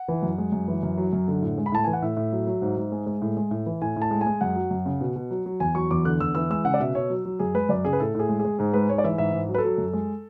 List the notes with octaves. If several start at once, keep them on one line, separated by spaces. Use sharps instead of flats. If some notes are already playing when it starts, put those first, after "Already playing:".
Already playing: F#5
E3
F#2
G#3
F#2
E3
F#2
F#3
F#2
D3
A2
G#3
B5
A2 A5
E3 G#5
F#5
A2 E5
A2
F#3
F#3
G#2
G#2
G#3
G#3
A2
G#3
A2
E3
A2 G#5
A2
A5
G#3
G#5
G#3
F#2 F#5
F#3
F#2
C#3
B2
B2
F#3
F#3
E2 G#5
F#3 C#6
E2 D6
D3 F#6
E2 E6
E3 E6
G#3 E6
C#3 F#5
D5
B2 E5
B2 C#5
F#3
F#3
F#2 G#4
G#3 B4
F#2 D5
C#3 G#4
B4
A2 A4
A2 G#4
G#3
G#4
G#3
G#2 G#4
G#3 B4
G#2 C#5
D5
E3 E5
G#2 E5
G#2
F#3
B4
A4
F#3
F#2
G#3